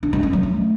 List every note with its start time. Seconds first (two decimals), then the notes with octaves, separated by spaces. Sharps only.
0.03 D4
0.13 G#3
0.23 C#4
0.33 F#3
0.43 A3